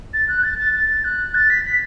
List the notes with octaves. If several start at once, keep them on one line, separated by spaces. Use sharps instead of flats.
A6
F#6
A6
A6
A6
F#6
A6
B6
B6